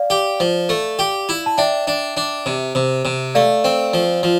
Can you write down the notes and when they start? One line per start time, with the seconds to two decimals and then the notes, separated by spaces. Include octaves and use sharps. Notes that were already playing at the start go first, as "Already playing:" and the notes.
Already playing: D5 F5
0.10 G4
0.40 F3
0.69 A3
0.99 G4
1.29 E4
1.46 A5
1.58 D4 E5 G5
1.87 D4
2.17 D4
2.46 C3
2.75 C3
3.05 C3
3.35 A3 D5 F5
3.64 C4
3.94 F3
4.23 F3